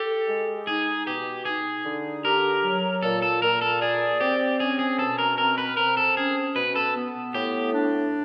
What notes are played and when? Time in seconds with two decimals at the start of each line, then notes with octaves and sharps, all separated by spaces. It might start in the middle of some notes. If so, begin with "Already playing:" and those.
Already playing: G4 A4
0.28 G#3
0.67 D#4 G#4
1.07 B2 G4
1.45 D#4 G#4
1.85 D3
2.24 G4 A#4
2.63 F#3
3.03 A#2 A4
3.22 A4
3.42 A#2 A#4
3.62 A4
3.81 G#4 D5
4.20 C4 G4
4.60 C#4 G#4
4.79 G#4
4.99 B2 A4
5.18 A#4
5.38 C4 A#4
5.58 B4
5.77 C4 A#4
5.97 A4
6.16 C#4 G#4
6.55 B2 B4
6.76 A4
6.95 B3
7.34 A2 G4
7.73 D4